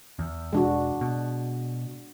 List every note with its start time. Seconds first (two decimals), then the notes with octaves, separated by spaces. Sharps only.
0.19 E2
0.53 E1 G#3 D4 F#4
1.01 B2